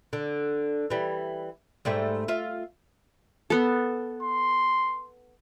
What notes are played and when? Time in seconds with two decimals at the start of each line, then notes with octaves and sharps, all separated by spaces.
0.13 D3
0.90 E3 G3
1.85 G#2 G3 A3
2.28 F4 E5
3.50 B3 A4
4.23 C6